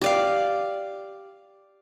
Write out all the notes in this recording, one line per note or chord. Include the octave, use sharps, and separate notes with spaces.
G4 D5 F5